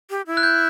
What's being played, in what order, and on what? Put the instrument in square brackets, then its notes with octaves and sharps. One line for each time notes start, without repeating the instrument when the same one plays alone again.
[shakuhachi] G4
E4
[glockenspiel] F#6
G6